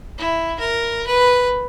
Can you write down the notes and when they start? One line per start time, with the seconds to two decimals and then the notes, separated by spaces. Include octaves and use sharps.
0.18 E4
0.59 A#4
1.07 B4